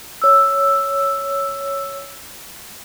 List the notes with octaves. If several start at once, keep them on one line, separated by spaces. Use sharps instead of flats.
C#5 E6